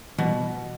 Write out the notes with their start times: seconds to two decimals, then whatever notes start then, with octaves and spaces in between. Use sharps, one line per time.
0.18 B2 E3 G3